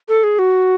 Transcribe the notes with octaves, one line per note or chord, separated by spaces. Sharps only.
A4
G#4
F#4